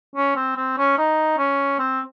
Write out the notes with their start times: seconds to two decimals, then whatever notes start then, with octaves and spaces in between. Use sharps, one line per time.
0.16 C#4
0.36 C4
0.56 C4
0.78 C#4
0.98 D#4
1.38 C#4
1.79 C4